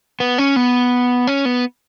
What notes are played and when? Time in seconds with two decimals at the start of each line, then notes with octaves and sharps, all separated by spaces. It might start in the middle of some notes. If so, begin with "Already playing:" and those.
0.20 B3
0.38 C#4
0.56 B3
1.27 C#4
1.45 B3